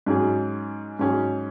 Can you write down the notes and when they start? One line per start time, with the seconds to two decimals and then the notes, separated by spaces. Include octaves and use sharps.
0.06 G#2 F#3 C#4 G#4
0.99 G#2 F#3 C#4 G#4